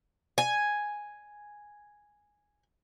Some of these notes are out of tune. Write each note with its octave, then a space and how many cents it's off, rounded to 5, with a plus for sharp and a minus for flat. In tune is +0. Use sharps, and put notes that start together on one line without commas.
G#5 +0